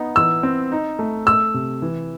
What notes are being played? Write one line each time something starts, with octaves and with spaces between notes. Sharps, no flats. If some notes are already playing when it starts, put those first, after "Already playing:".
Already playing: B3 D#4
E3 E6
C4
D#4
A3
A3 E6
C3
E3